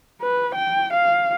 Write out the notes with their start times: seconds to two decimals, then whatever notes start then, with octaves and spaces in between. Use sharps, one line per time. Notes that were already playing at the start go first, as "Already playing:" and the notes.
0.22 B4
0.55 G5
0.93 F5